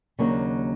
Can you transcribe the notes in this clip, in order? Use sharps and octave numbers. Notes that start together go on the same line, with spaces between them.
D#2 C#3 F#3 A#3 D4